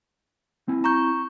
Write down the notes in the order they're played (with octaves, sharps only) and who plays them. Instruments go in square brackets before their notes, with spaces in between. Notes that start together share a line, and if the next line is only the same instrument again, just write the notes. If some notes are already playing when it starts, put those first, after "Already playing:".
[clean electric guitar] C4 E4 G#5
[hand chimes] A#5 C#6 G6